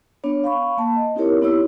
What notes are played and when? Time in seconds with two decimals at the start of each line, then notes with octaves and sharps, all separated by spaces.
0.24 B3 D4 C#5
0.44 F5 B5 C#6
0.78 A#3 A5
0.96 D#5
1.15 C4 D#4 E4 G4 A#4 C#5
1.42 B3 D#4 E4 G4 C#5 E6